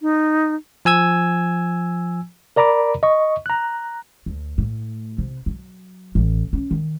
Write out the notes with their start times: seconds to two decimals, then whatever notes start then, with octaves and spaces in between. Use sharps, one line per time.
0.01 D#4
0.85 F3 G#5 E6 G#6
2.56 A#4 D5 A#5 B5 D6
3.03 D#5 C#6
3.46 A#5 F#6
4.26 D2
4.58 A2
5.18 C3
5.46 F#3
6.15 A1
6.53 C#4
6.71 D#3